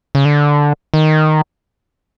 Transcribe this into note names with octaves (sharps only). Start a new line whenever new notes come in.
C#3
D3
D#3